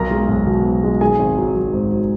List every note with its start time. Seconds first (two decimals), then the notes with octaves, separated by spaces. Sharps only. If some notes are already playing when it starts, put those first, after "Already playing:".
Already playing: B1 A#4 A#5
0.11 G#3
0.29 B1
0.47 B2
0.65 B1
0.84 G#3
1.01 D#3 G#4 G#5
1.19 G#1
1.38 F#3
1.55 F#3
1.73 G#2
1.92 F#3